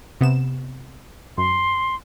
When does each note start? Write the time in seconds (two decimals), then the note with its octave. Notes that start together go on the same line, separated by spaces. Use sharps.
0.21 C3 B3 E7
1.38 F#2 C6